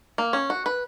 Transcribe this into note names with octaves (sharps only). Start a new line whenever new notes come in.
A#3
C#4
F#4
B4